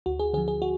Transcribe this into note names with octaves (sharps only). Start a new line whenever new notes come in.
D2 F#4
G#4
D3 F3 G#4
G#4
F#4